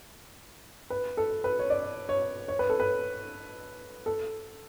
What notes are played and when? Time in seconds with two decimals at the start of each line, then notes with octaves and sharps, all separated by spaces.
0.90 B4
1.17 A4
1.44 B4
1.59 C#5
1.70 D5
2.09 C#5
2.48 C#5
2.59 B4
2.69 A4
2.80 B4
4.06 A4